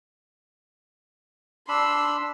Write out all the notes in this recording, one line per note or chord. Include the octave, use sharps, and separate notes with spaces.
D4 B5 C6 E6